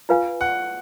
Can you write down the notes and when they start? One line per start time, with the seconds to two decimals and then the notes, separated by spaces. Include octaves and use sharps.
0.09 F4 B4 F5 G#5
0.41 F#5